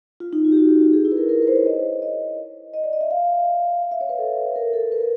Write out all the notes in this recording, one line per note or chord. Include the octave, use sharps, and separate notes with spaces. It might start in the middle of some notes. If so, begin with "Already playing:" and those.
F4
D#4
F4
G4
F#4
G4
G4
G#4
E4
B4
A#4
A#4
B4
C5
C#5
D#5
D#5
D#5
D5
D#5
E5
F5
F5
E5
C#5
B4
A4
A#4
A4
B4
A#4